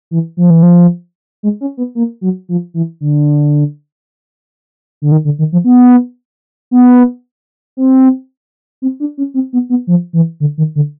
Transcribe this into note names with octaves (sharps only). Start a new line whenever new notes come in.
E3
F3
E3
F3
G#3
C#4
B3
A#3
F#3
F3
E3
D3
D3
D#3
D3
D#3
F3
B3
B3
C4
C4
D4
C#4
C4
B3
B3
F3
E3
D3
D#3
D3